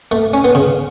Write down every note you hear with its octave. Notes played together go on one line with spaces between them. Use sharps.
A3
C#4
B3
C#3